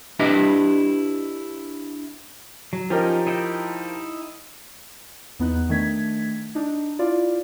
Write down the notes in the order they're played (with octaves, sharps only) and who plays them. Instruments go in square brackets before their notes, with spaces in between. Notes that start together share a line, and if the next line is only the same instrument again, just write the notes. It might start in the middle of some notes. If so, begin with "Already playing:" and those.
[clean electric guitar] D4 E4 G4 B4 D#5 E5
[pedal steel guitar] F#3
[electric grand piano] F3 G4 A#4 [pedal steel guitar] C#4 D#4
[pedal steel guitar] D#4 E4 G5
[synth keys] E2 B3 D#4 F#6
D#3 A3 D4 G#6 B6
D4 D#4
E4 F4 D5